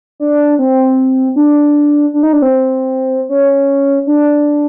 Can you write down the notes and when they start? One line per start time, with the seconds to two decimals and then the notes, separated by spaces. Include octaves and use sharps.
0.20 D4
0.59 C4
1.36 D4
2.14 D4
2.23 D#4
2.33 D4
2.42 C4
3.29 C#4
4.07 D4